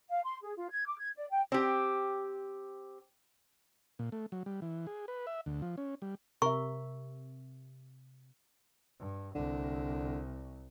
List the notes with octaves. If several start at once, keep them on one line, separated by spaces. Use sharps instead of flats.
F5
C6
G#4
F4
G#6
D6
G#6
D5
G5
C4 G4
A#2
A3
F#3
G3
E3
G#4
B4
E5
D2
F3
C#4
G3
C3 A#4 E5 C#6
G2
C2 D3